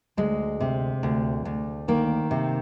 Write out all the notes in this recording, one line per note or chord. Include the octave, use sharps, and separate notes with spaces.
D2 G#3
C3
D2
D2
D#3 A#3
C3